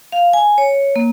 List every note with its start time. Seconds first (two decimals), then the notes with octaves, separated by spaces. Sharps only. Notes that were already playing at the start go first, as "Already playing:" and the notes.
0.12 F5
0.33 G#5
0.58 C#5
0.96 A#3